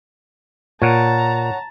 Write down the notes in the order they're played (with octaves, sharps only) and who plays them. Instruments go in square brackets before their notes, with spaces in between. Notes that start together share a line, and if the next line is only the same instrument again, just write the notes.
[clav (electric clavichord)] A#2 [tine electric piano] C#5 F#5 [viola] A5 A#5